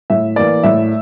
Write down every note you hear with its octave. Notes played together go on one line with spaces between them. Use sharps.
A2 E5
E3 A#3 D5
A2 E5